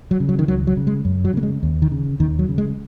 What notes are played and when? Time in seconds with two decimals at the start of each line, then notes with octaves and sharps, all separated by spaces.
0.11 F#3
0.20 C#3
0.29 F#3
0.39 D#3
0.48 C#2 F#3
0.67 F#3
0.77 C#3
0.87 G#3
1.05 F#2
1.25 F#3
1.33 C#3 A#3
1.43 G#3
1.63 D#2
1.82 D#3
1.92 C#3
2.20 D#2 D#3
2.39 F#3
2.48 C#3
2.58 G#3